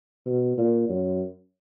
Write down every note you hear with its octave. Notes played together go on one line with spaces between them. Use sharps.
B2
A#2
F#2